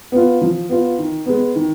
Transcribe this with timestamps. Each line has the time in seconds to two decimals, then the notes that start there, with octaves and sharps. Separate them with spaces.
0.12 B3 F4
0.42 F3
0.69 B3 F4
0.99 D#3
1.26 G#3 B3
1.56 D#3